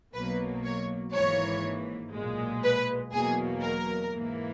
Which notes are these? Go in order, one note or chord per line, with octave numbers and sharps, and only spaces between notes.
B1 B2 F#3 A#3 B4
C#5
G#1 G#2 E3 A#3 C#5
B1 A#2 G#3
B4
E2 B2 F#3 A#3 G#4
A#4
G#2 E3 A#3